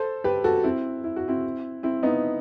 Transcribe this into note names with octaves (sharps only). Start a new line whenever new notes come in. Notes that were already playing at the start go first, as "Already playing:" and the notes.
Already playing: A4 C5
G4 B4
F#4 A4
C4 E4
E4
F#4
C4 E4
C4 E4
B3 D#4